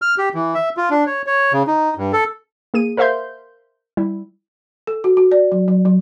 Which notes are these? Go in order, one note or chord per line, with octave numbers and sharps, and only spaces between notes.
F6
G4
E3
E5
F4
D4
C#5
C#5
C#3
D#4
G2
A4
A#3 G#4 D#7
A#4 C5 E5 F5 C6 G6
G3 E4
A4
F#4
F#4
D5
F#3
F#3
F#3